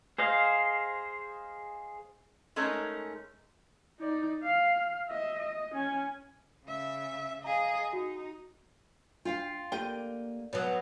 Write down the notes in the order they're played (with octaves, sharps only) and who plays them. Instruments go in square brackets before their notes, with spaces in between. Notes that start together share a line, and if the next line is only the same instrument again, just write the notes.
[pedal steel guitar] G#4 C5 D#5 F5
[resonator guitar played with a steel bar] G#3 A3 C#4 D#4 A#4
[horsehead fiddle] D#4 D5
F5
D#5 E5
D#5
C#4 G#5
[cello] C#3 E5
[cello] G#4 D#5 [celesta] F5 A#5
[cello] D#4 [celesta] F#4
[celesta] D4 [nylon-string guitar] F4 F5 G5
[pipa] D3 G5 [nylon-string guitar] A#3 [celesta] G4 A#4 D#7
[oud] B2 F#3 [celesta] C#5 F#5 F#6